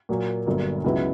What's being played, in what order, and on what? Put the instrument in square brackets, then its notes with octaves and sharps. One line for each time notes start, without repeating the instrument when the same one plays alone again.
[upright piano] A#2 F#3 A#3
G1 G2 F#3 A#3
C#2 C#3 F#3 B3 E4